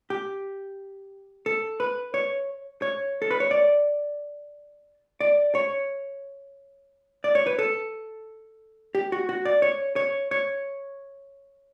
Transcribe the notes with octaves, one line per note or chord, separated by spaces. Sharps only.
G4
A4
B4
C#5
C#5
A4
B4
C#5
D5
D5
C#5
D5
C#5
B4
A4
G4
F#4
F#4
D5
C#5
C#5
C#5